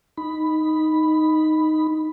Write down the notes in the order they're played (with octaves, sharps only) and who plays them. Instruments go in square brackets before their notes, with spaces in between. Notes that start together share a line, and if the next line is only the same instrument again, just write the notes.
[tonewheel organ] D#4 B5